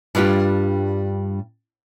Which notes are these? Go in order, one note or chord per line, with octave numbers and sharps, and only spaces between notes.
G2 G3 D4 F4 G4